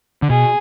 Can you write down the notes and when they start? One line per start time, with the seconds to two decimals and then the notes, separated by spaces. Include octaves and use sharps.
0.22 D3
0.30 B2 G#4